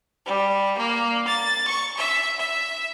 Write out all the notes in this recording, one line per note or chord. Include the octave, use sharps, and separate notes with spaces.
G3
A#3
A6
C#6
E5
E5